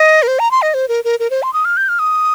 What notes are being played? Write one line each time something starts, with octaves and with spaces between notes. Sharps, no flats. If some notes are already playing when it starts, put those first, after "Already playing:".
Already playing: D#5
A#4
C5
A#5
C6
D#5
C5
A#4
A#4
A#4
C5
C6
D#6
F6
G6
F6
D#6